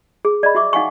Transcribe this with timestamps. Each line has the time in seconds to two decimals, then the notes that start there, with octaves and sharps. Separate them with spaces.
0.25 G#4
0.43 D5 D#5 B5
0.55 F#4 E5 C#6 D6
0.73 D#4 F5 F#5 G#5 C#6